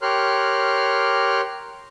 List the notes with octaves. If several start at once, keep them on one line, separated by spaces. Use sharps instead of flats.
G4 A#4 C#5 C6 F6 F#6